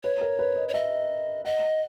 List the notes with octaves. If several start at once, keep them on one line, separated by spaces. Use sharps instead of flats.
B4 C#5
A#4
B4
D#5
C#5
D#5 E5
D#5 F#5